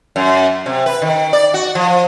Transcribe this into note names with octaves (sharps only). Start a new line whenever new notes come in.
F#2
C3
B4
D#3
D5
F#4
F3